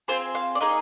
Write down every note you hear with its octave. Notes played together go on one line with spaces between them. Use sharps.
C4 F4 G#4 C5
F5
D5
A#3 D#4 G#4 D#5